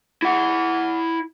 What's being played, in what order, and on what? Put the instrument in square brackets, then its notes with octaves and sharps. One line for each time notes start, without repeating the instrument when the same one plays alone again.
[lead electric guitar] E4 F#5